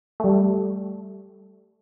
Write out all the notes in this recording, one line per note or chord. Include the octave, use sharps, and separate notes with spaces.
G3 A3